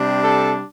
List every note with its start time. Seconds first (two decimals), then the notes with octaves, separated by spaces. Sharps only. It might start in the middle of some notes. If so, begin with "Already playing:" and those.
Already playing: C3 G3 D4
0.23 A4